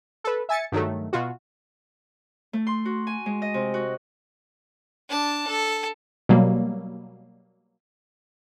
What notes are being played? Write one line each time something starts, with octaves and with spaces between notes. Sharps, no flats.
A4 B4
E5 G#5 A6 C#7
G2 D#3 F#3 A3
B2 F4 F#4
A3
C6
F#4
G#5
G#3
D#5
C3
F#4
D4 A5
A4
B2 F#3 G3 A#3